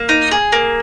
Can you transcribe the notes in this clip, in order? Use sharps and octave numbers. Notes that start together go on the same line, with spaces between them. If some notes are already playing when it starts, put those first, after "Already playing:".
Already playing: A#3
D#4
G#4
A#3